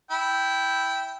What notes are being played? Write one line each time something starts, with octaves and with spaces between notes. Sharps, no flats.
E4 G5